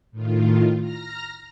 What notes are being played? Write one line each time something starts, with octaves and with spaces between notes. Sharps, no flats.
A2 D#3 F4
A#5 F6 A#6